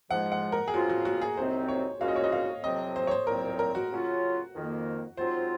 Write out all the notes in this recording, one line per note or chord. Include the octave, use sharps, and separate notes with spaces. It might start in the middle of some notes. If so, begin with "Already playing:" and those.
G#2 F3 G#3 F#5
F#5
A#4
G#4
C#3 F3 C4 F4 F#4
F#4
F#4
G#4
C2 C3 F#3 C4 D#4 C5
C#5
C2 A#2 G#3 C#4 F#4 F5
D#5
C#5
D#5
F5
F2 C3 F#3 C4 D#5
C5
C#5
C5
C2 A#2 F#3 C4 A#4
A#4
F#4
C#3 F#3 C#4 F4
F2 D#3 A#3
G#2 F#3 C4 F4 C5